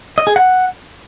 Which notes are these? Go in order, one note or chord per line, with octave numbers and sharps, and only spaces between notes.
D#5
G#4
F#5